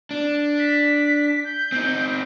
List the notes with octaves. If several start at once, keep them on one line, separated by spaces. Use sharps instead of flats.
D4
B6
G6
C4 D#4